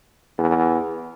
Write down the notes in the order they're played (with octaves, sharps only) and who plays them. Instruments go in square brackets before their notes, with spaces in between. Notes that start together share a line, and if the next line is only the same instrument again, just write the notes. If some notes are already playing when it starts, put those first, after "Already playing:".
[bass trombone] E2